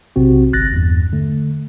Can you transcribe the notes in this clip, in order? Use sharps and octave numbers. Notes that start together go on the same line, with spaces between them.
B1 C3 C4 F#4
G1 F#6 A6 A#6
E2 G2
D3 A3